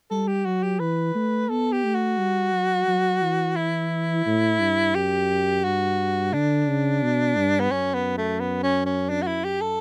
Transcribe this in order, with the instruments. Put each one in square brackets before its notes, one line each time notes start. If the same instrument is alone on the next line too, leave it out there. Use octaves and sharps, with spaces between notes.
[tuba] G3 [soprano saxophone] A4
[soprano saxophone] G4
[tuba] F#3 [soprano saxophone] F#4
[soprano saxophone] G4
[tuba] E3 [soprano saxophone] B4
[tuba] A3
[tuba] B3 [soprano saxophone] A4
[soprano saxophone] G4
[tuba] A3
[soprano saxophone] F#4
[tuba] G3
F#3
F#3
E3
[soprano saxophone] E4
[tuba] A2
G2
[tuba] F#2 [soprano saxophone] G4
[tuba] G2 [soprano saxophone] F#4
[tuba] D3 [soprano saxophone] D4
[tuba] C#3
B2
G2
[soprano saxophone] B3
[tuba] F#2 [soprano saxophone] C#4
[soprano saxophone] B3
A3
B3
C#4
C#4
D4
F#4
E4
G4
A4